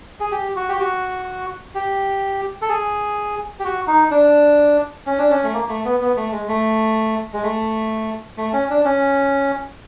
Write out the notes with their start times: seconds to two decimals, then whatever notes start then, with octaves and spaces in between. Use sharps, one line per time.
0.20 G#4
0.32 G4
0.56 F#4
0.69 G4
0.80 F#4
1.75 G4
2.62 A4
2.69 G#4
3.59 G4
3.64 F#4
3.87 D#4
4.11 D4
5.07 C#4
5.18 D4
5.30 C#4
5.44 A3
5.54 A#3
5.69 A3
5.85 B3
6.01 B3
6.17 A3
6.32 G#3
6.48 A3
7.34 G#3
7.43 A3
8.38 A3
8.53 C#4
8.70 D4
8.85 C#4